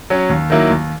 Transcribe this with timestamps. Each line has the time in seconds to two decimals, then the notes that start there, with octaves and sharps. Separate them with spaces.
0.10 F#3 C#4
0.30 D#2
0.50 D#3 F#3 A#3 E4
0.70 D#2